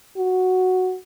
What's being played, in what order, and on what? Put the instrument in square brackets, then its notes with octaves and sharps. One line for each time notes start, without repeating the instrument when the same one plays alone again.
[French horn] F#4